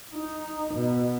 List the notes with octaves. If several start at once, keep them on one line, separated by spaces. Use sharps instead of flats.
D#4
B2